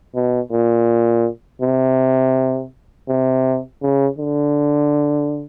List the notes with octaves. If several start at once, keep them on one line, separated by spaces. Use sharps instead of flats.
B2
A#2
C3
C3
C#3
D3